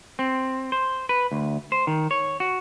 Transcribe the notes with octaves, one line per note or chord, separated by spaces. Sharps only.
C4
C5
B4
D2
C5
D#3
C#5
F#4